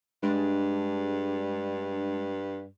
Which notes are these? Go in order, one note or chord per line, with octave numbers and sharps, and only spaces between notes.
G2 G#3 D4